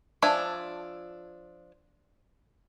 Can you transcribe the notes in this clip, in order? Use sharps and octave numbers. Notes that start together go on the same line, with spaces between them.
F3 D4 E5 G#5